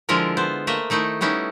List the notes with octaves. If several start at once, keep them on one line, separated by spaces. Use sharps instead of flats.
D3 F3 G#3 E4 F4 A#4
B3 C5
A3 A#3 D#5 E5
D#3 A3 D#4 E4
G3 B3 C#4 D#4 E4